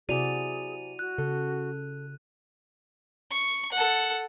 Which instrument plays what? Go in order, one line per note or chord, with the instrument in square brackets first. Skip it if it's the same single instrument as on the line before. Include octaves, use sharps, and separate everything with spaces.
[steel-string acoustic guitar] C3 G#5 [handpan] E4 F#4 D5 [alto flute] G#4 [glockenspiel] D#7 F7
[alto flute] F#4 [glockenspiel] F#6
[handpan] C#3 [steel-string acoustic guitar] A4
[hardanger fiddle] C#6
A4 F#5